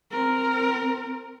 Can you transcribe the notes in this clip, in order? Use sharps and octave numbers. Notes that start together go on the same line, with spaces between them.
C4 A#4